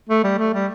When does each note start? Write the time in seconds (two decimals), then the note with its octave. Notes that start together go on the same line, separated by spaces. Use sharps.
0.09 A3
0.23 G3
0.38 A3
0.53 G3